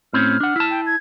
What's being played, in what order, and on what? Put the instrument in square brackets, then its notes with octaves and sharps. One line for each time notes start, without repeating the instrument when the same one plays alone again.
[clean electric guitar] A2 C4 C#4 [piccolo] F6
[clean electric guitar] D4 F#5
E4 A5
[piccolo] G5
G#6